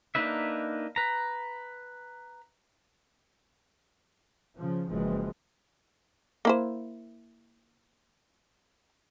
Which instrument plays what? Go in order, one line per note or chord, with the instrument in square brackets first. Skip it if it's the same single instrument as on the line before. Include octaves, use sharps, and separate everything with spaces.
[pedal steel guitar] A#3 D4 D#4 B4 E5
B4 A#5
[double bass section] C#3 F3
F#1 E3 F3 G#3
[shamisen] A#3 E4 C5